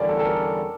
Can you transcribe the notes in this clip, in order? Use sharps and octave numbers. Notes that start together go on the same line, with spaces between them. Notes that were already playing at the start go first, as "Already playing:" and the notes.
Already playing: E2 D3 G3 C#4 A#4 D5
A4
A4
A#4